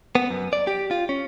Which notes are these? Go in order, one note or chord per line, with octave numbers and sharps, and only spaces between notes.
B3
F#2
D5
G4
F4
C#4